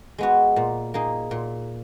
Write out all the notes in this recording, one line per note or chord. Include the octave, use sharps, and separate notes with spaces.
G#3 B3 F#4
A#2
A#3 D#4 G#4
A#2